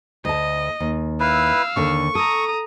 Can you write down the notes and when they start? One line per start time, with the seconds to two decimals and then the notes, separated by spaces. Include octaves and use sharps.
0.25 D2 D#5 A5
0.80 D#2
1.20 E4 B4 F5 E6
1.76 D#2 D3 C#6
2.15 A4 A#5 D#6